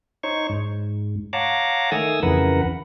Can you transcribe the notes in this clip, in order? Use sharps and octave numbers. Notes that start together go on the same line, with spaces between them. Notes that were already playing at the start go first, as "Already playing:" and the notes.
D#4 C5 C#5 C#6
G#2
C#5 F5 F#5 A5 A#5 D6
D#3 A3 G#5 D#6 E6
F2 C#3 E3 A#4 B4 F#5